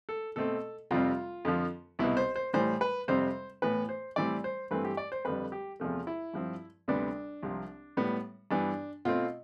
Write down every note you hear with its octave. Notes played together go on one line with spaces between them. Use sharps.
A4
B2 A3 C4 A4
F2 C3 G3 C4 F4
F2 D3 F3
C2 B2 B3 E4
C5
C5
A2 E3 G3 C5
B4
F2 C3 G3 C4 C5
A2 E3 B3 B4
C5
A2 E3 G3 C4 D5
C5
G2 E3 A3 C4 B4
G4
D5
C5
F2 D3 G3 B4
G4
E2 C3 F3 A3
E4
G2 F3 C4
D2 C3 G3 B3 D4
C2 C3 F3
A2 G3 B3
G2 E3 B3 D4
B2 A3 C4 F4